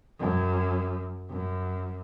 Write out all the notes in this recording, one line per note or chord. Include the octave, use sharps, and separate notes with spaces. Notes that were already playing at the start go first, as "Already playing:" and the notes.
F#2
F#2